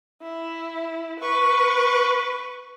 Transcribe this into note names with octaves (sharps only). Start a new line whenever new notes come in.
E4
B4 C#6